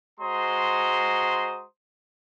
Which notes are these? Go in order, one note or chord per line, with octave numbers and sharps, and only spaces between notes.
G#3 F#4 C5 A#5 C6 D#6